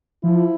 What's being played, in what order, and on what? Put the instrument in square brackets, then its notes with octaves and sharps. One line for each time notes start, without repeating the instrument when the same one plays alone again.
[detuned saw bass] F3 [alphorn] E4